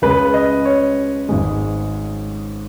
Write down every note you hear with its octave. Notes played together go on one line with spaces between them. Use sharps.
C#2 C#3 G#3 B4
D#5
C#5
G#1 G#2 G#3